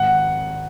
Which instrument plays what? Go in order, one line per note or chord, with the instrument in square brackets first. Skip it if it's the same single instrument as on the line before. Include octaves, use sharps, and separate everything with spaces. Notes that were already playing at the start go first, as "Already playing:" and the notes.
Already playing: [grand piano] G#1 F#5